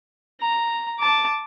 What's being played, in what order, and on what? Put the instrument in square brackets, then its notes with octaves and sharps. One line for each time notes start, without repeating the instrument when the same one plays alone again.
[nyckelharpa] A#5
A5 D6